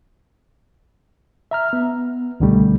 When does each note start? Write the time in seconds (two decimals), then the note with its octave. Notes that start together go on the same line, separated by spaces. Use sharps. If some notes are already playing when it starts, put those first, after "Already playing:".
1.51 E5 A#5 F6
1.73 B3
2.40 C#2 B2 D3 D#3 G3 A3